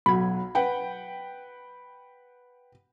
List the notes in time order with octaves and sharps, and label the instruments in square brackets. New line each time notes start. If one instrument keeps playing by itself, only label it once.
[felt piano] B1 F#3 [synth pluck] B5 G#6
[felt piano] B4 F#5 G5